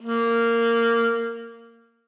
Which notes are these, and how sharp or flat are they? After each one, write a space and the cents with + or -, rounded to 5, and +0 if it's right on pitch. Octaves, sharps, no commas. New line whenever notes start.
A#3 -15